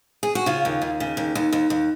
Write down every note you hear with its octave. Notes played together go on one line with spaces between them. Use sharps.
G#4
F#4
C#3 F4
D#2
D#2
C#3
D#2
D#2
D#2
D#2